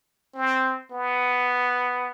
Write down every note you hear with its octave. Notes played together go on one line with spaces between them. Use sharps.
C4
B3